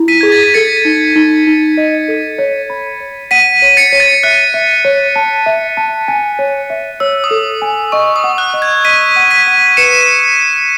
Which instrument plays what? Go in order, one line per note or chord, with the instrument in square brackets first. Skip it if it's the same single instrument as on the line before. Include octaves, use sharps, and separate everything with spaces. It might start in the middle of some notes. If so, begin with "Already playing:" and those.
Already playing: [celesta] E4
[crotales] B6 D#7
[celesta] G#4 [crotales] G#6
[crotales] A6
B6
[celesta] A4 [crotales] A6 C#7
[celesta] D#4
D#4
D#4
D#5
A4
C#5
B5
C#5
[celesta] F#5 [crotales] B6 D#7
[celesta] C#5
[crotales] A6 C#7
[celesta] C#5
[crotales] A6
[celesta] E5 [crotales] F#6
[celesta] E5
C#5
A5
E5
A5
G#5
C#5
E5
[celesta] C#5 [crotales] E6
[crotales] D#6
[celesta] A4
G#5
[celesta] D#5 [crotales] C#6
[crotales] D#6
[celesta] F#5
[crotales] F#6
[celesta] D#5
[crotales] G#6
[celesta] D#5 [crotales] B6 D#7
[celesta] F#5
[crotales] B6 D#7
[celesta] F#5
[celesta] B4 [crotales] C#7 E7